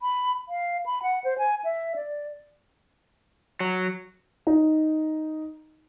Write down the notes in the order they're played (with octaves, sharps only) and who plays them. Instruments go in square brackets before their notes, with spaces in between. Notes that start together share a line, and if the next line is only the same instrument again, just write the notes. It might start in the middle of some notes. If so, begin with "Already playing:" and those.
[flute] B5
F5
B5
F#5
C5
G#5
E5
D5
[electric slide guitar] F#3
[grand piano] D#4